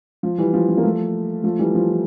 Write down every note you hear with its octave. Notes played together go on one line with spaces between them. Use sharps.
F3
E3 G3
F3
F3
A#3
F3 A3
F3 A3
E3 G3
F3
E3